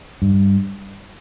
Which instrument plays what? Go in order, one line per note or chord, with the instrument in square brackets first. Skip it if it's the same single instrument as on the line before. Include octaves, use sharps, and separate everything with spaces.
[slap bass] G2